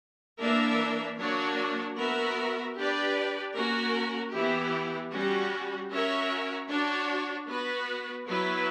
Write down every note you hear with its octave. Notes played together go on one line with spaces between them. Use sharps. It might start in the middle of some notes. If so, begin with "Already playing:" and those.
E3 A#3 D4 A#4 E5
F#3 A#3 D4 F#4 C#5
B3 F#4 A#4 E5
D4 G4 B4 D5
A#3 C#4 F#4 A#4
E3 B3 E4 G4
G3 C#4 F#4
C#4 F#4 A#4 C#5 E5
D4 F#4 C#5
B3 F#4 B4
F#3 B3 E4 B4